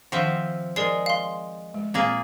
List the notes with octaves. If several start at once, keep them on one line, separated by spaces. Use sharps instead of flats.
D#3 F3 C4 E5 F#5
G#3 A#4 D5 C7
F5 C6
G#3
A#2 A#3 C4 G#4